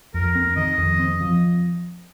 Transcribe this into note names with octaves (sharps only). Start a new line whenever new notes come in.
F2 A#4
C4
D#3 D#5
F2
C4
F3